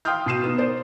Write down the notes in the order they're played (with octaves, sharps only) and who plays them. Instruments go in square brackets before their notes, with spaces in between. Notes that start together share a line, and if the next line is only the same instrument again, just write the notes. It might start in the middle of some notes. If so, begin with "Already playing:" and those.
[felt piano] F5 G5 C6 D#6 F6 G6
B2 B3 C7 D#7 E7
B3 D#4
A#4 C5 D5